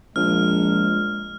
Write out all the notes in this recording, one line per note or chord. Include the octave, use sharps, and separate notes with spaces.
A#1 G#3 F6